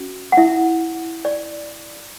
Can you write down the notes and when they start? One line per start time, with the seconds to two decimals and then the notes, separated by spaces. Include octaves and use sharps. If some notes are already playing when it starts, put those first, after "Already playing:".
Already playing: C#4 F#4
0.32 F#5
0.37 E4 E5
1.25 D5